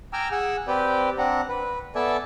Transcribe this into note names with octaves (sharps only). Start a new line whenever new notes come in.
G5 G#5 A#5 D6 E6 F6
G#4 F#5 E6
C4 G4 B4 D5 G5
C4 D4 F#5 A#5
B4
B3 A4 D5 E5 G#5 A5